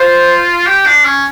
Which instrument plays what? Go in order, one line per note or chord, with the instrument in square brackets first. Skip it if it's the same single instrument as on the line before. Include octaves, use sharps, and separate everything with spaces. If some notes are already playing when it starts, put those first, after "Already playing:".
Already playing: [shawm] F4 [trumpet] C5
[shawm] G4
D4
C#4